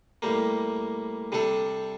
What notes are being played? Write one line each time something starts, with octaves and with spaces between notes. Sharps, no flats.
A2 G3 A#3
C3 G3 D4 A4